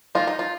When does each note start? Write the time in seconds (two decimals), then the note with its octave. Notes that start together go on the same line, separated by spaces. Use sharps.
0.15 D#3 A#3 D#4 F4
0.27 D#4
0.39 F4